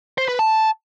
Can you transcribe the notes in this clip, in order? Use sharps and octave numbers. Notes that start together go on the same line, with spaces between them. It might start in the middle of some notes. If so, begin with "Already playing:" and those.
C5
B4
A5